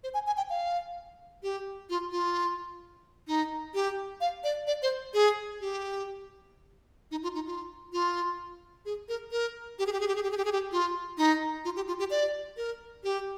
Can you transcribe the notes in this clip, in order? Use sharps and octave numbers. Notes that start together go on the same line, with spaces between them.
C5
G#5
G#5
G5
F5
G4
F4
F4
D#4
G4
F5
D5
D5
C5
G#4
G4
D#4
F4
D#4
F4
F4
G#4
A#4
A#4
G4
G#4
G4
G#4
G4
G#4
G4
G#4
G4
G#4
G4
F4
D#4
F4
G4
F4
G4
D5
A#4
G4